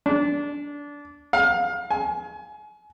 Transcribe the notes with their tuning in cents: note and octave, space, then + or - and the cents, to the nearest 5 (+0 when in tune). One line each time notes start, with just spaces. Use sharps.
D4 -20
F5 +25
G#5 +30